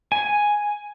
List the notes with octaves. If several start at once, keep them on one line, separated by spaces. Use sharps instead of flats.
G#5